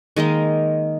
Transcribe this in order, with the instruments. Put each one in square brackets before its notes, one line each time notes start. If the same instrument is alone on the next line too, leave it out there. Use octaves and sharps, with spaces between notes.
[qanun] D#3 G#3 A#3 D#5